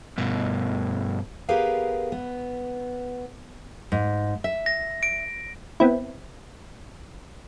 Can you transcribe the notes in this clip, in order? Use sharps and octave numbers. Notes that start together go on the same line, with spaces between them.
G2 B2
B3 G4 G#4 A#4 B4 F5
B3
G#2
E5
A#6
D7
B3 C4 E4